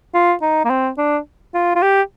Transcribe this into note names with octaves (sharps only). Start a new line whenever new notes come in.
F4
D#4
A#3
C4
D4
F4
F4
G4